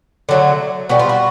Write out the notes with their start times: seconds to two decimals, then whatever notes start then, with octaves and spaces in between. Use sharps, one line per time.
0.29 D3 F#3 A3
0.89 B2 G3 F#4
0.99 F4
1.09 F#4